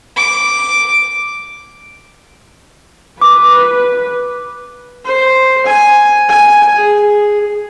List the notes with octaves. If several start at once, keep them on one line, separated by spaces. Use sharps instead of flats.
D6
B4 D6
C5
G#5
G#5
G#4